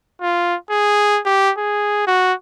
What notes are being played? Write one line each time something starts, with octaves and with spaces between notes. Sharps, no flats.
F4
G#4
G4
G#4
F#4